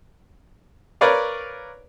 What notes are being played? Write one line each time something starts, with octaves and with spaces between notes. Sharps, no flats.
A#4 B4 C#5 D5 F5